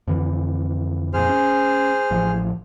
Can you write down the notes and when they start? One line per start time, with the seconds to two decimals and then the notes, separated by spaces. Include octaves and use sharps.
0.08 F2 D3 E3
1.14 F2 A#2 G#4 C5 F6
1.29 C#4
2.11 A1 F3